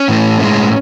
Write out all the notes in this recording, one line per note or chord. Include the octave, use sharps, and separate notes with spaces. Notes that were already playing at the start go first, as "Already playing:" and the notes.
Already playing: C#4
A2 E3 A3
A2 G#3